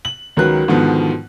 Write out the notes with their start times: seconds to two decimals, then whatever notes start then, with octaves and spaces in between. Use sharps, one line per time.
0.05 F#7
0.37 C#2 D#3 F#3 A#4 B4 F#6
0.68 G#2 B2 D3 D#3 F3 B3